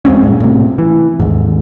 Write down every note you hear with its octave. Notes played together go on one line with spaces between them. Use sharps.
E2 G#3 C4 C#4
G2 A#2
A2 C3
E3
D#2 G#2